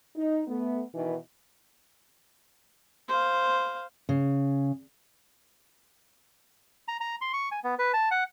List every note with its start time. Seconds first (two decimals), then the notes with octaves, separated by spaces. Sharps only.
0.16 D#4
0.48 A3 B3
0.94 B2 D#3 E3
3.08 C5 F5
4.09 C#3
6.88 A#5
7.01 A#5
7.21 C6
7.33 C#6
7.51 G#5
7.64 B3
7.79 B4
7.93 A5
8.11 F#5